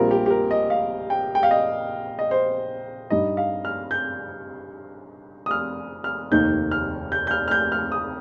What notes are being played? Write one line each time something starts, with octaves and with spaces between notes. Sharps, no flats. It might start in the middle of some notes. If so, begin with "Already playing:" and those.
Already playing: A#1 A#2 G3 C4 F4 A#4
G4
G4
A#4
D#5
F5
G5
G5
F5
D#5
D#5
C5
G2 G3 D#4 D#5
F5
F6
G6
D#6
F6
F6
F1 D#2 D#3 A#3 D#4 G6
F6
G6
G6
F6
F6
G6
F6
D#6